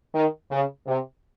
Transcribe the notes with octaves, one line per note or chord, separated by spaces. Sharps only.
D#3
C#3
C3